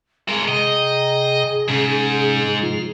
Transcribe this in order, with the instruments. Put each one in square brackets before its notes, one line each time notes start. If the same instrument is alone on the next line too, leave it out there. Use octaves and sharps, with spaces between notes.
[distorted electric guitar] G#3 A#4 [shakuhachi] G#4
[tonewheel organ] C3 G5 A#5 [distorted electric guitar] D#5
[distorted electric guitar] G#2 [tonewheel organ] C3 C#4
[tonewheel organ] F3 F4